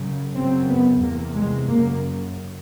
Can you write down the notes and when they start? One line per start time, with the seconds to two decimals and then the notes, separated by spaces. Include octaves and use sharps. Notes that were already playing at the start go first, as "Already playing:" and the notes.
Already playing: F#2 C#3
0.35 F#2 C#3 C4
0.69 B3
1.02 E2 C3 A#3
1.35 G#3
1.68 F#2 C#3 A#3